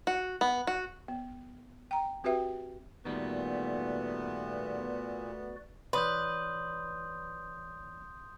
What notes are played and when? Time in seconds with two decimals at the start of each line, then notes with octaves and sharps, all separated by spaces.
0.07 F#4
0.41 B3
0.67 F#4
1.08 B3
1.91 G5 A#5
2.24 C4 F#4 G4 B4 E5 G5
3.05 A#2 D#3 G3 A3 B3 F#4 B4 D5
5.93 E3 B4 C#5 D5 C6 D#6 G6